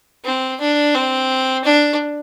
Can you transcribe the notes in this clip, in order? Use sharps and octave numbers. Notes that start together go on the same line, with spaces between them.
C4
D4
C4
D4